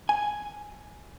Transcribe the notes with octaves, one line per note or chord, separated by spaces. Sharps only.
G#5